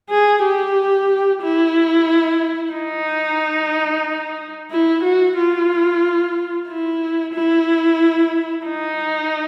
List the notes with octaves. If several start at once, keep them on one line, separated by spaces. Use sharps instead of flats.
G#4
G4
E4
D#4
E4
F#4
F4
E4
E4
D#4